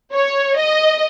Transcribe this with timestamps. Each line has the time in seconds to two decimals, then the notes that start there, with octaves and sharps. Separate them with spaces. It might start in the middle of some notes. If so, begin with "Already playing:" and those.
0.14 C#5
0.57 D#5